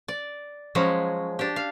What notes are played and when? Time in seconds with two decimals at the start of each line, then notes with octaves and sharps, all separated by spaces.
0.08 D5
0.75 F3 F#3 G#3 C#4
1.39 D4 G4
1.56 F5